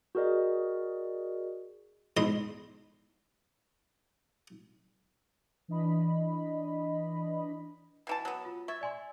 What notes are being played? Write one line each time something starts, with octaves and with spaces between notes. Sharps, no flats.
F#4 G#4 A#4 D5 D#5
E2 G#2 D#5 B5 C6 D#6
E3 D4 D#5 B5
B2 E3 A5
F#3 B3
F4
E5 C#6 G#6 A6
D5 G#5 C6